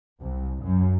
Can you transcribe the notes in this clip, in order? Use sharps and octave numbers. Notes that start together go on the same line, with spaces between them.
C2
F#2